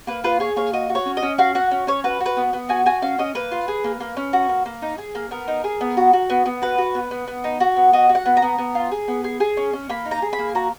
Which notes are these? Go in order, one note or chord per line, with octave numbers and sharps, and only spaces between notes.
A#3 B4
F4 B4
G#4 C#5
A#3 C#5
F#4 D#5
F#4
C#5
C#4
D#5
C#4
F#4 F5
F#4 F#5
C#4
C#4 C#5
F#4 B4
F#4
B4
B3
B3
F#4 G#5
F#4 G#5
C#4 F5
C#4 D#5
A#3 B4
F4
G#4
A#3
A#3
C#4
F#4
A#3
A#3
D#4
G#4
A#3
B3 A#4
D#4
G#4
B3
F#4
F#4
B3
B3
F#4 B4
F#4
B3
B3
B3
D#4
F#4
B3
F#4 D#5
F#4
F#5
B3
A#5
B3
B3
F4
G#4
B3
G#4
G#4
C#4
C#4
A#3 B5
D#4
A#5
G#4
B5
A#3
F#4 A#5